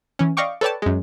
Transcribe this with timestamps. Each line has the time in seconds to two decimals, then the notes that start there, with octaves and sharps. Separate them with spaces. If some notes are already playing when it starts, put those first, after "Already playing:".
0.19 E3 C#4
0.37 D5 D#5 F5 G5 C#6 D6
0.61 A4 B4 C#5 D5 G5 A5
0.82 F#2 G#3